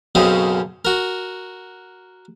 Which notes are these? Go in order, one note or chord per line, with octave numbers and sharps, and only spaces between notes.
B1 F#2 C#3 C4 D#5
F#4 A#4